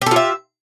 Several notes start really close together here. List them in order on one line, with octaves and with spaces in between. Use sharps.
G4 A4 F4 E5